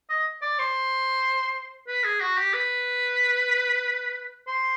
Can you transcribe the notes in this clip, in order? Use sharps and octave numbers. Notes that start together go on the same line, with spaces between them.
D#5
D5
C5
B4
G#4
F#4
G4
B4
C5